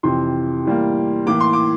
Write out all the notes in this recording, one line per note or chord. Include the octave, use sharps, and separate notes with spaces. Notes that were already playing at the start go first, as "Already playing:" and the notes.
F2 C3 E3 C6
A2 E3 G3 A#3
A2 E3 A#3 D6
C6
D6